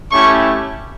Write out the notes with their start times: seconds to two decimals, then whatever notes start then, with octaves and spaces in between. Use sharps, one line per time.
0.11 A3 C#4 E4 G4 C#6